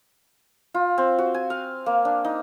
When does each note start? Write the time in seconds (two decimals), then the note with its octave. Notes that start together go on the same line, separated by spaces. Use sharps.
0.74 F4
0.98 C4
1.18 F#4
1.34 G#5
1.50 F5
1.86 A#3
2.05 D4
2.24 D#4